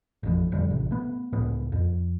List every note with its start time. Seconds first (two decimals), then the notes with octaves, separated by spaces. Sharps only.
0.23 A1 F2 A2
0.51 G1 F2 D3 G3
0.70 A1 C3
0.91 A3 B3
1.33 C#2 A2 B3
1.72 F2